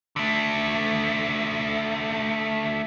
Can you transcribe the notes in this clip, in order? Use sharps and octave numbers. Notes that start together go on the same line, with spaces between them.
D3 A3